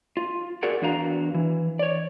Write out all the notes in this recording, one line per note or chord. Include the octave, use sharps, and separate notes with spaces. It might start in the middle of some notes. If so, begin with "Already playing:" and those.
F4
F#4 G#4 A#4 D5 F#5
E2 D4 F#4 F5 A#5
E3
C#5 D5